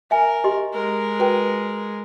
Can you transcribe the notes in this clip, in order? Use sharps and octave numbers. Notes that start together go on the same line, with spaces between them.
A#4 E5 G#5
G4 D#5 C6
G#3 A#4
F#4 B4 G5